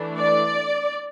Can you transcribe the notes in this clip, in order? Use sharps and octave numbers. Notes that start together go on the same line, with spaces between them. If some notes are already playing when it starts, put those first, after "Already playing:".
Already playing: E3 A3 D4
D5